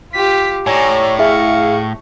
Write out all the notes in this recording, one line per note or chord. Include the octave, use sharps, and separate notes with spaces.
F4 G4 B6
A2 C#5 D5 G#5 A#5
E4 G#4 E5 F5 C#6